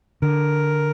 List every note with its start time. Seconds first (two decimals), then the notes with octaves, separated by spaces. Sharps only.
0.22 D3 A#4